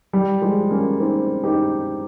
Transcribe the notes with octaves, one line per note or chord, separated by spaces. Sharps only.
G3
F3 G#3
A#3 C#4
C4 D#4
D#4 G4